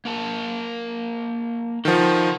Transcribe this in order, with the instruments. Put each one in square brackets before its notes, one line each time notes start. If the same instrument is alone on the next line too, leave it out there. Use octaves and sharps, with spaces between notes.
[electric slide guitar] A#3 A#4 A5
[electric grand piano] D#3 F3 [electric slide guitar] A4 F#5